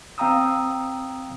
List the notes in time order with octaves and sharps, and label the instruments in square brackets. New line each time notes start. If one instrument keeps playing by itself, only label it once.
[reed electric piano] C4 F5 G5 A#5 D#6 E6